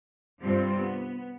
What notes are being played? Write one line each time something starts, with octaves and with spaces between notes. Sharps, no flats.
G2 C3 G3 C4 F4
B3